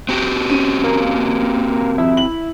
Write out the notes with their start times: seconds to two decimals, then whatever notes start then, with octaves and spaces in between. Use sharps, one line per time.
0.09 C4 F#4 G4
0.50 C#4 D#7
0.84 A#3
1.98 F2 E4
2.17 F#7